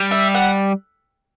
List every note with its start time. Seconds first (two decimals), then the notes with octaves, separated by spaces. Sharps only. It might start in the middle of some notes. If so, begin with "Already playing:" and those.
Already playing: G3
0.11 E5
0.35 F#5